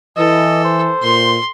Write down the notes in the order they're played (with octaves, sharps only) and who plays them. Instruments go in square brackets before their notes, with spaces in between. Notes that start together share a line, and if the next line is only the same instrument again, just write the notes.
[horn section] E3 [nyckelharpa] A4 [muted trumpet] D#5
[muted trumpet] C5
[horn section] A#2 [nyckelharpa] C6